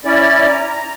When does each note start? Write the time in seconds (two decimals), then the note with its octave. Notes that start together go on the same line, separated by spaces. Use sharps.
0.05 C#4 E4 D5
0.49 A#5